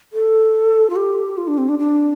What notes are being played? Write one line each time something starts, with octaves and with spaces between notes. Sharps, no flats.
A4
F4
G4
F4
D4
C4
D4
D4